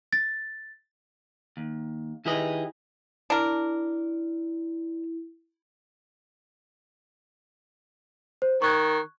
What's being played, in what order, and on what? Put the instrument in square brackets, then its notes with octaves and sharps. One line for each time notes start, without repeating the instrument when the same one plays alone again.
[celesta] A6
[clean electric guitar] D#2
D#3 E4 G4 G#4 B4 D#5
[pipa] D4 A#4 [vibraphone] E4
[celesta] C5
[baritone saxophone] D#3 [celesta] C#6 F#6 G#6